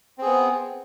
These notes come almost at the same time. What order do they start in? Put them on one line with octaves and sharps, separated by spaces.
C4 G#4 B3